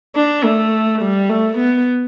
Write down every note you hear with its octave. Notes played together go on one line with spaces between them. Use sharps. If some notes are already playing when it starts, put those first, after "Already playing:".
D4
A3
G3
A3
B3